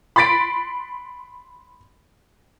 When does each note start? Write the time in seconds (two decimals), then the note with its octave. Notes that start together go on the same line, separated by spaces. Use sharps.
0.16 B5 C6 A6 B6 D7